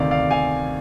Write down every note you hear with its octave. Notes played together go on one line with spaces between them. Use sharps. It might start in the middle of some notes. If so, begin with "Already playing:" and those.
Already playing: D2 C3 D#3 D5 F5
D5 F5
F5 G#5